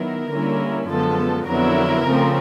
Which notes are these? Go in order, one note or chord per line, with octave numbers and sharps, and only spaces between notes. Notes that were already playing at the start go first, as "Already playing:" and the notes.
Already playing: D#3 F#3 B3 E4 A#4
D3 G3 A#3 C#4 E4
F#2 D3 F3 G#3 B3 A4
F2 D3 F#3 B3 E4 A#4
C#3 F3 A3 C4